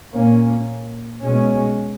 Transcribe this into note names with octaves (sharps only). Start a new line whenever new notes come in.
A#2 A#3 C#4
B2 G#3 C#4